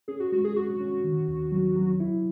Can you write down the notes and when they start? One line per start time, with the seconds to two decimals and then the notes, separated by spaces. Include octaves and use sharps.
0.08 C#4 G#4
0.20 F#4
0.32 G#3 F#4
0.44 G#4
0.56 C#4 F#4
0.81 C#4
1.04 D#3
1.28 D#2
1.52 F#3
1.76 F#3
2.00 E4